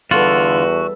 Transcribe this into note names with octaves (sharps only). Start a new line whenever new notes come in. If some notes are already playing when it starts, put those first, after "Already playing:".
E2 D3 G3 F4 F#4 A4 B4